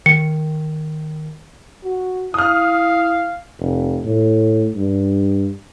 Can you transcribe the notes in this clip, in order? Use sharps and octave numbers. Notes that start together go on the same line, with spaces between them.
D#3 C#7
F#4
E4 F5 D#6 F6
F1
A2
G2